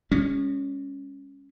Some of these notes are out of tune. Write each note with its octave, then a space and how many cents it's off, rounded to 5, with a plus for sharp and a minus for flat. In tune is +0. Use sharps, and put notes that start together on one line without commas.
G#3 -40 C#4 +0